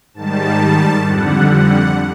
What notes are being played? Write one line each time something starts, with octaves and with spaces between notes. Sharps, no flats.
G#2 D#3 G3 A5
F2 D3 G3 F#5
F#5